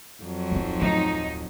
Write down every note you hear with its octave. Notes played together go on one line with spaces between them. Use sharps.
F2 F3 F#3
D1 D#4
D1 A3 D#4